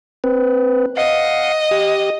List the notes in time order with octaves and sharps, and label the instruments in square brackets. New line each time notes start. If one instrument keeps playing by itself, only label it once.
[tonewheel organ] C4 B4
[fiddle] D#5 [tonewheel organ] F5 F#5
[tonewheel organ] G4